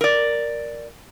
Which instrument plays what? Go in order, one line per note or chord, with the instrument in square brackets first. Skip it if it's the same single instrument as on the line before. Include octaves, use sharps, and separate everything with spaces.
[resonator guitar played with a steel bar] A#4 D5